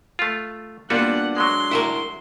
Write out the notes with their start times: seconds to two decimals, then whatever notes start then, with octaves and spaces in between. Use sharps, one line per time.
0.19 A3 F4
0.90 G3 A#3 B3 D4 F4 F#4 F#5
1.37 F#3 G#3 C6
1.71 E4 F#4 A#4